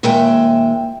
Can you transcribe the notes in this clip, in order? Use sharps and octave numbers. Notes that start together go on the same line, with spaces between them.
D#2 A#2 G#3 E5 G5